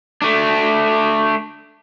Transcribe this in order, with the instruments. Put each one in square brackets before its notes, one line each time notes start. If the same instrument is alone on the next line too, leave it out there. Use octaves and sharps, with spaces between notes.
[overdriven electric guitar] A3 D4